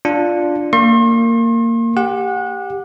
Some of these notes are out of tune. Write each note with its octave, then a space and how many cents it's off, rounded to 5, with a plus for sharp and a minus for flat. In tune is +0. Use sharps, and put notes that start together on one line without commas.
D4 +0 F4 +0
A#3 -20 C6 +45
G4 +10 F#5 -25